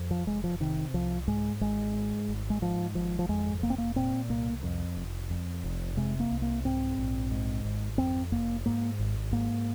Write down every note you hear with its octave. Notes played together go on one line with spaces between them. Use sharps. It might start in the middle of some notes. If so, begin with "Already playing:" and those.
Already playing: F2
F3
F1 G#3
F3
C3 D#3
C2 F3
G#2 G#3
G#1 G#3
G#2
G#1
G#3
G#2 F3
G#1 F3
F3
F2 G#3
F1 A#3
C4
A#3
A#2 C4
C2 A#3
F2
F1
F2
F1
C3 G#3
A#3
C2
A#3
G#2 C4
A#1
G#2
G#1
F2 C4
F1 A#3
G#2 A#3
G#1
G#2 A#3